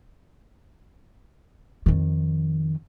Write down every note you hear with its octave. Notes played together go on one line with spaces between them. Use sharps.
F2 D#3